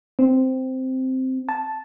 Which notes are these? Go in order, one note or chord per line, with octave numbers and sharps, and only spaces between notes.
C4
A5